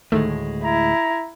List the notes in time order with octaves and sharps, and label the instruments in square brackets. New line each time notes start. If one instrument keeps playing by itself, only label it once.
[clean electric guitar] D2 A2 G#3 [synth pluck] D#3 A3 A4
[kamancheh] E4 [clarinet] A#5